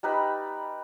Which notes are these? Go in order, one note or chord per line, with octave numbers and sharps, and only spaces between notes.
G3 D#4 B4 B5